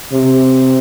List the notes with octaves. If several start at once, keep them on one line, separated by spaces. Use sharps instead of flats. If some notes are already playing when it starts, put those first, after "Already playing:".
C3